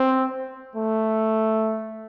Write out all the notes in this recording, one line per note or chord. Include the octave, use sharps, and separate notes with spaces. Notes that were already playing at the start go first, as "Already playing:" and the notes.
Already playing: C4
A3